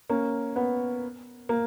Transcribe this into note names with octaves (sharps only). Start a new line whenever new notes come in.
A#3 C#4
B3
A#3